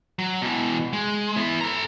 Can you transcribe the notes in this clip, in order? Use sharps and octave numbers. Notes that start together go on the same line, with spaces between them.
F#3
B2 E3
G#3
B3 E4
A4 A#5